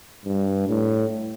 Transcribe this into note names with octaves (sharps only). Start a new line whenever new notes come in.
G2
A2